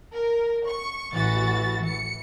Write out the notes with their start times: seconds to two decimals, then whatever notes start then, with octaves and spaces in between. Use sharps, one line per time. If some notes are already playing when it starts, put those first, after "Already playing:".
0.12 A#4
0.67 C#6
1.12 A1 E3 F#4 A6
1.81 E3 C#7